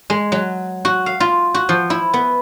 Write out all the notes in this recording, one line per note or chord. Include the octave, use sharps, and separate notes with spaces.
G#3
F#3
F#4
F5
F4
F#4
F3
E4
B3